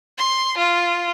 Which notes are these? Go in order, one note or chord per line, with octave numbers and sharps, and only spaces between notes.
C6
F4